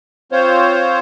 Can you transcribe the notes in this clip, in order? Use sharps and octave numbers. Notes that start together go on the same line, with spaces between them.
C4 F4 C5 C#5